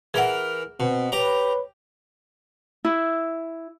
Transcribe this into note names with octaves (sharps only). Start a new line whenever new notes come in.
E3 G#4 A#4 E5 F#5
B2 C4
G4 B4 C#5 A#5
E4